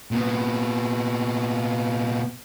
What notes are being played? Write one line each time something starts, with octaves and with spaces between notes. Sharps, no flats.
A#2 B3